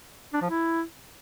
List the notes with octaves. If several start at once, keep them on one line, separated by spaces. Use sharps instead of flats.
D4
F3
E4